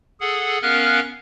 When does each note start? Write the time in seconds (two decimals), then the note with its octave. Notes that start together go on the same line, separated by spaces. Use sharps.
0.20 G#4 A4 F#5
0.62 B3 C#4 A#4 F5 F6 F#6